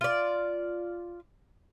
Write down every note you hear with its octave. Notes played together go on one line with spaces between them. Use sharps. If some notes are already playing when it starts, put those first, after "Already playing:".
F4 D5